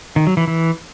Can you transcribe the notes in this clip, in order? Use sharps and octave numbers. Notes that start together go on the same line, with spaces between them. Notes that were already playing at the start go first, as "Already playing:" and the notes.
D#3
F#3
E3
E3